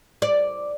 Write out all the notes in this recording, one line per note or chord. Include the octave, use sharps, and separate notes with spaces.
D5